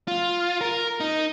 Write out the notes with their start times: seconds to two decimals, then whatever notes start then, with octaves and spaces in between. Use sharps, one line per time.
0.08 F4
0.61 A#4
1.00 D#4